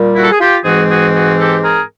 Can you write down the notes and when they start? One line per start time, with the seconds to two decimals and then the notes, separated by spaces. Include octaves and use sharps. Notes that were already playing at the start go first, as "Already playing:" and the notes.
Already playing: A#2 G3 A#3
0.15 E4 F#4
0.23 A4
0.31 G#4
0.40 F4 G4
0.64 G#2 E3 G#3 C4 F#4 G#4
0.89 F#4 G#4
1.14 F#4 G#4
1.38 G4 A4
1.63 G#4 A#4